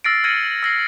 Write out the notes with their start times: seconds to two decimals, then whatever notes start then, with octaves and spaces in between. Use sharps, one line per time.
0.04 E6 F6 A6 A#6 C7 D7
0.24 F6 G#6 A#6 C#7 D#7 F#7
0.63 E6 A#6 C7